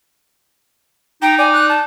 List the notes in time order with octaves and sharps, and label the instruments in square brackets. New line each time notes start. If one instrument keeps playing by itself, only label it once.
[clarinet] D#4 [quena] G5 [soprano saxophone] A#5
[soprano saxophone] D5 [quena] G#5
[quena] F#6
A5